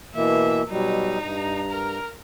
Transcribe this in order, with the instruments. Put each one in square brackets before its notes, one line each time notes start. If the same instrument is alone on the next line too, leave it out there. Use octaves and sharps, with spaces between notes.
[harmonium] B2 E3 A#3 [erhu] E5
[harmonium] B2 F#3 G3 [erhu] D#4
[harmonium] G2 A#5
[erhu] A#4